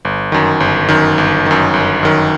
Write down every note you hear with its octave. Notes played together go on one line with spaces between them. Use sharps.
G1
F#2 D#3
G1
F#2 D#3
G1
F#2 D#3
G1
F#2 D#3